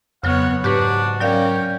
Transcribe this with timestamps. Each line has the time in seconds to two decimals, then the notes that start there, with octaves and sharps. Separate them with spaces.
0.23 F2 C#3 F#3 B3 C#5 F#5
0.64 G#2 D4 F#4 G4 B4
1.20 F#3 C#4 A#4 D5 F5 G5